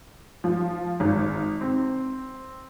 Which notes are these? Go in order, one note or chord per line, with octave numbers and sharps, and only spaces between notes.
F3
G#1
C4